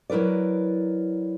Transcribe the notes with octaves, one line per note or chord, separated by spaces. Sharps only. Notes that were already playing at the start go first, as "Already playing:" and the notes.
F#3 E4 A#4 B4 D5